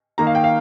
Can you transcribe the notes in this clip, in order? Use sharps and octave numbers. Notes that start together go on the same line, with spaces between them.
D#3 A#3 D#4 A#5
F5
G5
F5